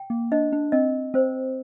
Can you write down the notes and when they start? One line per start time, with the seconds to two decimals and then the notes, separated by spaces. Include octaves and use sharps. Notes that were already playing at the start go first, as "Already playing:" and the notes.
Already playing: G5
0.10 A#3
0.32 D4 D#5
0.52 D4
0.72 C4 D#5
1.14 C4 C5